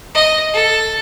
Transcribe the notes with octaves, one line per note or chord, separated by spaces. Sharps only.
D#5
A4